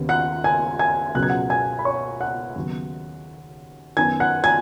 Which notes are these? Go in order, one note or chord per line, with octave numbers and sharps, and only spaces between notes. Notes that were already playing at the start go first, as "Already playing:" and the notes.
Already playing: D#2 C#3 B3
F#5 F#6
G#5 G#6
G#5 G#6
C#2 B2 F#3 B3 F#6
G#6
F#5 F#6
G#5 G#6
B5
C#5 C#6
F#5 F#6
D#2 C#3 F#3 B3
F#2 D#3 B3 G#5 G#6
F#5 F#6
G#5 G#6